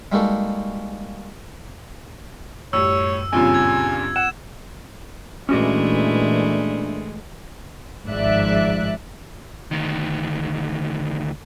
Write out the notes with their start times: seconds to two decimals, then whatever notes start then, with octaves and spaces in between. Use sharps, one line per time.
0.12 G3 G#3 A#3 D#4 F#4 A4
2.73 F#2 A2 G3 C#5 E6
3.33 G2 A#2 C#3 C4 F4 G#5
3.54 G#6
4.16 F#5 E7
5.49 A#2 E3 G#3 A3 C#4 D4 F#4 D5
8.08 G#1 G#2 F3 D5 E5 F#6
9.71 D2 D#3